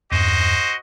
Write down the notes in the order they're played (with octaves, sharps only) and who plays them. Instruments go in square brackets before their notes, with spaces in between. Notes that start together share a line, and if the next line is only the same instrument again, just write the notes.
[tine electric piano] E2 G2 [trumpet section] F#4 C5 D#5